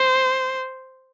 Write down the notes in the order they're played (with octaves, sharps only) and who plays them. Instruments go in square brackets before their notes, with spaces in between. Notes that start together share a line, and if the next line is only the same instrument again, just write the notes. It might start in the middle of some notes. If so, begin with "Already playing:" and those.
Already playing: [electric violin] C5